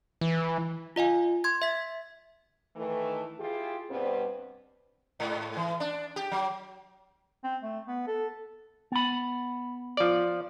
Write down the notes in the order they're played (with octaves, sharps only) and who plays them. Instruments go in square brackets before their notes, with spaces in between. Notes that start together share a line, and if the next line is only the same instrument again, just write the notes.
[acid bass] E3
[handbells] F4 D#5 F5 G#5
C6 G#6
E5 B6
[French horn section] D#3 E3 A3
E4 F4 G4 G#4
G2 B2 G3 B3 C4
[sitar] G#2
E3
D4
G4
F#3
[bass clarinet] C4
A3
B3
A4
[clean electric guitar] B3 B5
[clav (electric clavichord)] F3 D5